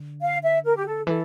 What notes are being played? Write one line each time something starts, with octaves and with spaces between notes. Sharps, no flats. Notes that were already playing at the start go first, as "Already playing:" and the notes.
Already playing: D3
F5
E5
A#4
G4
A4
E3 A4